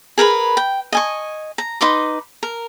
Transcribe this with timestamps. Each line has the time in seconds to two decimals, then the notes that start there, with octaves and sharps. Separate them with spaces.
0.18 G#4 A#4 B4 B5
0.57 G5
0.93 D#5 G#5 C#6
1.58 A#5
1.81 D#4 B4 C6 D6
2.43 A#4